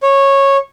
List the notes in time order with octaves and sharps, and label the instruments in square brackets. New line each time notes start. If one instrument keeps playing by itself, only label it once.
[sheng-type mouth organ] C#5